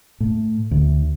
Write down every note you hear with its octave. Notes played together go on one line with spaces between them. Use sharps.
A2
D2